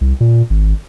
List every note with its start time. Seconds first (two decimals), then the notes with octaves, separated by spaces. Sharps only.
0.01 C2
0.21 A#2
0.50 G#1